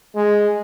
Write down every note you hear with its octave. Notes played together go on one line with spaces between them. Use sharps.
G#3